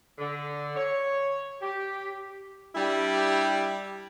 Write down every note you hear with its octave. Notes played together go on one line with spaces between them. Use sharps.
D3
C#5
G4
G3 D4 E4 G4